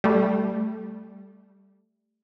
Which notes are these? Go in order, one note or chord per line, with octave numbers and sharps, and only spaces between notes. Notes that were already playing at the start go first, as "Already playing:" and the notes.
G3 A3